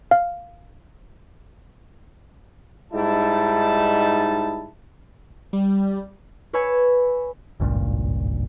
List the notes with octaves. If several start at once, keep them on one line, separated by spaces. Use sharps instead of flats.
F5
G#2 G3 D#4 E4 A5
G3
B4 C#5 G#5 B5 E6 G#6
G#1 C#2 G2 A#2